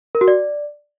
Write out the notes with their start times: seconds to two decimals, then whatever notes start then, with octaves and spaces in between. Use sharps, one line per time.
0.15 A#4
0.21 F#4
0.28 D5